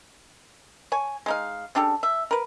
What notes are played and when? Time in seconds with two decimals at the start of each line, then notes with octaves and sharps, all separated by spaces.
0.92 C#5 G#5
1.26 G#3 D#4 F5
1.75 C#3 D4 G4 A4
2.03 E5
2.31 A#4 B4